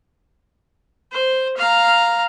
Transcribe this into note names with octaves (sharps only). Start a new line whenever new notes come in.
C5
F5 A#5